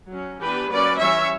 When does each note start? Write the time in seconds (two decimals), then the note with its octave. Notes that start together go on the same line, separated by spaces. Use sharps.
0.11 F#3 C#4
0.41 E3 B3 D4 G4 B4
0.70 F#3 A#3 C#4 B4 D5
0.99 E3 G3 C#4 C#5 E5